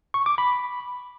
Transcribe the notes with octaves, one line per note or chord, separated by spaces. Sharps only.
C#6
D6
B5